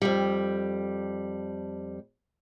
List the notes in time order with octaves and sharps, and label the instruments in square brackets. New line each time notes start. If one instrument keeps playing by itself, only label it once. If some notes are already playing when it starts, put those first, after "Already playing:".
[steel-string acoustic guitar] F2 G3